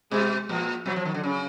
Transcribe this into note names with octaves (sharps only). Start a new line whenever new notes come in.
B2 G#3
A#2 F3
B2 F#3
F3
D#3
D3
C#3